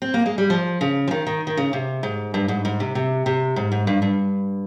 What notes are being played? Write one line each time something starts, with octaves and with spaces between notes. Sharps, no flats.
C4
A#3
G#3
G3
F3
C#3
F3
D#3
D#3
D#3
C#3
C3
G#2
G2
G#2
G#2
C3
C3
C3
G#2
G#2
G2
G2